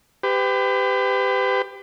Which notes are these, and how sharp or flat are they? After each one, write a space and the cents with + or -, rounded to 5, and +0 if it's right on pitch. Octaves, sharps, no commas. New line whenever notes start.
G4 +10 B4 +35